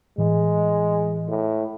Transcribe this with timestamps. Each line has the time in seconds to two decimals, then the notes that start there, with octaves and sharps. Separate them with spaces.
0.18 A2 E3 G#3
1.28 A2